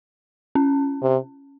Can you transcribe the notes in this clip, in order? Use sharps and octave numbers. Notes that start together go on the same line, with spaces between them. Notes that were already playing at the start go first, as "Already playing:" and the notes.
C#4
C3